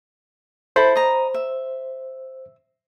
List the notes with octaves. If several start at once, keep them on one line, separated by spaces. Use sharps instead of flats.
E4 A4 C5 B5
D#5 A#5
E5